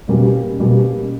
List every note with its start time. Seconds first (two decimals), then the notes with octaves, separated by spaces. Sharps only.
0.08 B2 G3 A#3 C#4 G4
0.59 B2 G3 A#3 C#4 G4